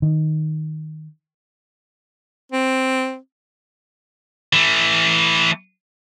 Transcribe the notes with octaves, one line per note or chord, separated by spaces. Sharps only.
D#3
C4
E3 A3